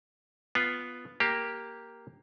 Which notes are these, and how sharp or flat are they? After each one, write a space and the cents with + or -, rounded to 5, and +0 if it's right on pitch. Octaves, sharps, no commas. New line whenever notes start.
B3 +0 F4 +0
A#3 +0 G4 +0